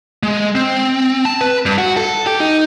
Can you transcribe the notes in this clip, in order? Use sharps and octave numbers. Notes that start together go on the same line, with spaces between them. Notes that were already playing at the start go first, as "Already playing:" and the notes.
G#3
C4
A5
B4
G2
F#4
A4
G4
D#4